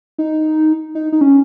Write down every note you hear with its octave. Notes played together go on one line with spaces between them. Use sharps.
D#4
D#4
D#4
C#4